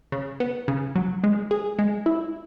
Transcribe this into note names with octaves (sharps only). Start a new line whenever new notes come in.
C#3
B3
C#3
F#3
G#3
G#4
G#3
E4